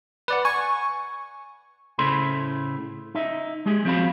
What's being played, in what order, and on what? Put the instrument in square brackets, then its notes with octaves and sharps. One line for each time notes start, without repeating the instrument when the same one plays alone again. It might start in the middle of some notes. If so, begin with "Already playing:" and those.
[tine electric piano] B4 D5 F#5
[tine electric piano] G#5 [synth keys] C#6
[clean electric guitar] A2 C#3 E4 A4 C5 B5
D#4 E5
G#3 G4 G#4
F3 C4 F#4 F5 B5